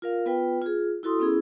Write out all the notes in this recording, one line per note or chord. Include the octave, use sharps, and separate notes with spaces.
F4 A#4 F5
B3 F4 B4 G5
F4 G#4
E4 F#4 A4 C6 D#6
B3 C#4 E4 G#4